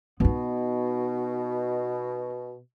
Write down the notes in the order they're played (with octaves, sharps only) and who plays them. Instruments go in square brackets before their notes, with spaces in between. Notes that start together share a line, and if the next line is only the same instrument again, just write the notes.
[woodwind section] B2 [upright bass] B3 D#4